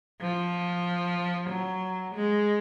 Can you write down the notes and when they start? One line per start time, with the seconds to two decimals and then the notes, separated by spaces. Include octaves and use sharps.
0.21 F3
1.49 F#3
2.15 G#3